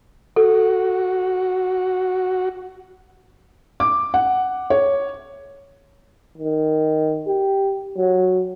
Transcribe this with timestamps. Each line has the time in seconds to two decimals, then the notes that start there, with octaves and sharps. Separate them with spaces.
0.36 F#4 A4
3.80 D6
4.14 F#5
4.70 C#5
6.38 D#3
7.27 G4
7.97 F#3